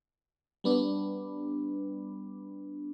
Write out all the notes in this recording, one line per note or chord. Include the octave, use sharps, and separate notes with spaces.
G3 B3 D4